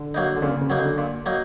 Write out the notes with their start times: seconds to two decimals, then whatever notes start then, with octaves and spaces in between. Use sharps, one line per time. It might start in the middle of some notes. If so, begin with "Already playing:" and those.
Already playing: D3
0.14 F#3 A#3 D#4
0.36 D3
0.42 A#2 C#3
0.61 C#3
0.70 F#3 A#3 D#4
0.80 D3
0.98 A#2
1.26 F#3 A#3 D#4